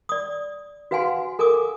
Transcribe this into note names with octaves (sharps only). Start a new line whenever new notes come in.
D5 D#6
F#4 B4 F5 F#5 G#5 C6
A4 A#4 G#5 D6 D#6